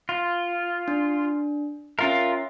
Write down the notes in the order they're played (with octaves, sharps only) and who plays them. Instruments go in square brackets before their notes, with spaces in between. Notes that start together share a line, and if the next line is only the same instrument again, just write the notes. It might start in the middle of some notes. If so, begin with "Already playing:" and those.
[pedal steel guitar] F4
[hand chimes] D4
[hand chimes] C#4 E5 [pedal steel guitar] F4 A#4